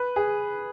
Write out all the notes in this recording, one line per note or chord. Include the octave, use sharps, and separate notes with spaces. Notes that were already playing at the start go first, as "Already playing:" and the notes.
Already playing: B4
G#4